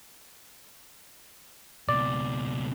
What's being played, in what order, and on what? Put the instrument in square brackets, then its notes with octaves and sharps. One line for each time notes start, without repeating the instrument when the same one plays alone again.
[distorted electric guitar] C#2 B2 [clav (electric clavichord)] D5